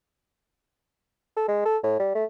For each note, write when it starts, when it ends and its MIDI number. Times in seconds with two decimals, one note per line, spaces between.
1.37 1.47 69
1.48 1.63 56
1.66 1.77 69
1.83 1.97 45
2.00 2.10 55
2.15 2.24 57